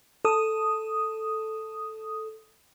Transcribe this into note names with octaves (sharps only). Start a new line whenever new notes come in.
A4 D#6